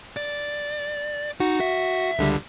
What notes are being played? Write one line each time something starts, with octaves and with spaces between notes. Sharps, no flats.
D5
D#4 F#4
E5
C#2 D3 G3